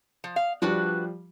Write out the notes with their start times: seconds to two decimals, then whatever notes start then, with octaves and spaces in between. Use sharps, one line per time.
0.24 F3
0.36 F5
0.62 F3 G3 D4 F#4 B4